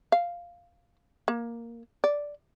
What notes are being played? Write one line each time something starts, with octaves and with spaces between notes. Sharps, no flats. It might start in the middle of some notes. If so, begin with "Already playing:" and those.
F5
A#3
D5